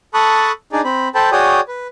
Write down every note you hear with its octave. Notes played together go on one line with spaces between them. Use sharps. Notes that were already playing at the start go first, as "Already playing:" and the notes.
A4 A5 B5 C#6 D#6 F#6
D4 D#4 G#4 D5
C4 B5
A4 C5 G5 A5 B5
F#4 G#4 C#5 D5 G5 D#6
B4